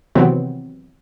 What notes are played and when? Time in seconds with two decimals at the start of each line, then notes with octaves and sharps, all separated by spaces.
0.15 C3 D#3 E3 F#3 B3 C4